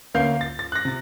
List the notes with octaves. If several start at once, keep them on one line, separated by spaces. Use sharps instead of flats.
D2 A#3 C#4 F5 G6 C7
A6
A6
F#6 A#6
C3 A6